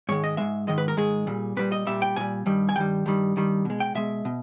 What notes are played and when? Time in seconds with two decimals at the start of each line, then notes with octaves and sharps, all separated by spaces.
0.09 G#2 D#3 G#3 C#5
0.24 D#5
0.37 G#2 D#3 G#3 E5
0.67 G#2 D#3 G#3 D#5
0.78 B4
0.88 A#4
0.97 G#2 D#3 G#3 G#4
1.27 A#2 G3
1.57 A#2 G3 B4
1.72 D#5
1.87 A#2 G3 E5
2.02 G5
2.16 A#2 G3 G#5
2.46 G2 D#3 G3
2.69 G#5
2.76 G2 D#3 G3 G5
3.06 G2 D#3 G3
3.36 G2 D#3 G3
3.65 B2 G#3
3.80 G5
3.95 B2 G#3 E5
4.25 B2